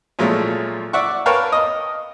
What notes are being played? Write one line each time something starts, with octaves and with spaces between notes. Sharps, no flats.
A#2 F3 F#3 G#3 A3
D5 E5 F#5 C#6
A#4 B4 C#5 F5 G5 A5
D#5 D#6